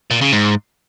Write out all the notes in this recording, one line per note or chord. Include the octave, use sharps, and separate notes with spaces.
A#2
C#3
G#2